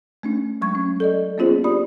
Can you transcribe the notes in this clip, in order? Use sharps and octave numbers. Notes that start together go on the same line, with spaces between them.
A3 C#4 D4
F#3 G#3 C#6 G#6
C#4
A4 D5 D#5
A#3 B3 C#4 F4 G#4 C5
D4 G4 D5 B5 D#6